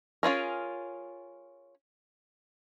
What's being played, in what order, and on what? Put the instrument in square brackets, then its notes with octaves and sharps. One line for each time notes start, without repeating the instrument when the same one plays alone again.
[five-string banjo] C#4 F4 G#4 A#4